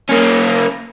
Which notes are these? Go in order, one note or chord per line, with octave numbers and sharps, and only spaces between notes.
A#3 C#4